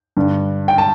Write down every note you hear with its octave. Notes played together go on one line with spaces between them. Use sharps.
G2 D3
G5
A5